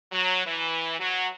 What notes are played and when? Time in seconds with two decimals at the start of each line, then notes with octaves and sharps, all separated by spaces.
0.12 F#3
0.46 E3
1.00 F#3